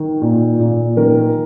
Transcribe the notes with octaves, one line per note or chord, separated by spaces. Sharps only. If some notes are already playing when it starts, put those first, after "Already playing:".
Already playing: D#3
A#2
A#2
D#3 A#4